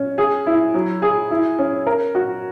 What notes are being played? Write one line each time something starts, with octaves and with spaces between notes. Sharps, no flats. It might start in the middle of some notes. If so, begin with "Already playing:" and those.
Already playing: C#4
G#4
E4
F#3
G#4
E4
C#4
A#4
F#4